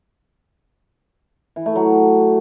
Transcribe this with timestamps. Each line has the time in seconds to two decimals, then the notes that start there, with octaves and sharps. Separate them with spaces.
1.56 E3
1.66 A3
1.76 F#3